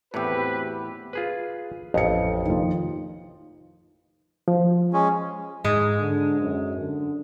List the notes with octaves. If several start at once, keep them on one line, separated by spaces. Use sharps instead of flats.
E2 A2 C4 E4 F#4 G4 B4
F4 G#4 B4
A1 F2 D#5 C#7
D#3 F3
F3
G#3 C#4
G#2 G#3
D3
F#2
D3